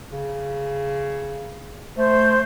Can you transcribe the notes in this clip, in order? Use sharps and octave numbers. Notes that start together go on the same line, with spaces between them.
C#3
A3 C5